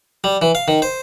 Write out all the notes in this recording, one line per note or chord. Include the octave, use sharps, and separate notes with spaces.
G3
E3
F5
D#3
C5